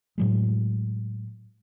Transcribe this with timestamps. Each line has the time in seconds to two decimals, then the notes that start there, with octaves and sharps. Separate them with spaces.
0.18 A2 F#3 G#3